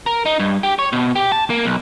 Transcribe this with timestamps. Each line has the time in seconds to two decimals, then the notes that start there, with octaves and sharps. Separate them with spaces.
0.06 A#4
0.25 D#4
0.40 G2
0.63 G4
0.79 C#5
0.93 B2
1.15 G4
1.32 A5
1.50 A#3
1.65 B1